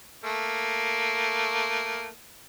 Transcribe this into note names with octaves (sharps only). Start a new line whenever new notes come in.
A3 A#3